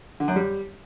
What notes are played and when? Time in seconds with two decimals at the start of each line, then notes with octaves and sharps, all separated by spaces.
0.20 D3
0.28 F#2
0.36 G3